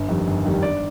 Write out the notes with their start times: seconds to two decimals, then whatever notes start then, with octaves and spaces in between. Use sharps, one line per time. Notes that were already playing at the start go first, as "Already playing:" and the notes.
Already playing: G1
0.08 F2 D#3 G3
0.27 G1
0.44 F2 D#3 G3
0.63 G1 D5